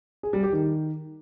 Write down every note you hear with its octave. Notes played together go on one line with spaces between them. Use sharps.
G#4
G3
G4
D#3